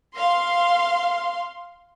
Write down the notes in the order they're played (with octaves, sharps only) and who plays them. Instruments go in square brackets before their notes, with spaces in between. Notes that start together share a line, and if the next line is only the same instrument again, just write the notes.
[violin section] F5 C6